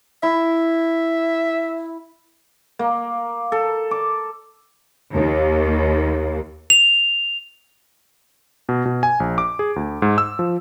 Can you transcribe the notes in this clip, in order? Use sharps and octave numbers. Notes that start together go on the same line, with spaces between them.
E4 E5
A#3
A4
D6
D#2
F7
B2
B2
G#5
A#1
D6
G#4
D2
G#2
E6
F3